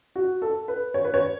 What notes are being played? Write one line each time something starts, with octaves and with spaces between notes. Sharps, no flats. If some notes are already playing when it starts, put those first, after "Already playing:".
F#4
A4
B4
C#5
B4
C#5